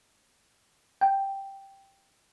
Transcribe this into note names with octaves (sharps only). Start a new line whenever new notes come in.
G5